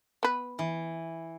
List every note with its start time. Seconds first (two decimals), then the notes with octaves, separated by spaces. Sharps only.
0.23 B3 B4
0.59 E3